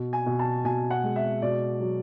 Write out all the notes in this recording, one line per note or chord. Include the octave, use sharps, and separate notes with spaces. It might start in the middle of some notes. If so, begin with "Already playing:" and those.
Already playing: B2
G#5
B2
A5
B2 G#5
F#5
G#3
E5
B2 D5
F#3